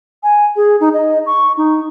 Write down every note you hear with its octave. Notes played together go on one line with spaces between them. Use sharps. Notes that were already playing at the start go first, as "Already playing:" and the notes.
G#5
G#4
D#4
D#5
C#6
D#4